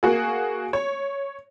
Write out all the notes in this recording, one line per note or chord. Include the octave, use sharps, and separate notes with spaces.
A#3 F#4 G#4
C#5